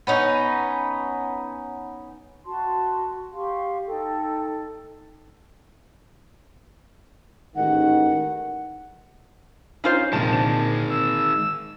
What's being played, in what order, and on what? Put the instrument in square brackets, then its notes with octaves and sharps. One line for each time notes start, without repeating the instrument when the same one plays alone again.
[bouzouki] B3 C#4 D#4
[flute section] F#4 A5 C6
G4 F5 C6 C#6
D#4 A4 G5
[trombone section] A1 G#2 D#3 [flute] F#5
[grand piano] C#4 G6 [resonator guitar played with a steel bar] D#4 F4 C5
[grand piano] F1 C2 [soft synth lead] A#2 [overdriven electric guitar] D#3 G#3 [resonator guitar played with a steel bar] A5
[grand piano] D3 C4 E7
[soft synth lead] E6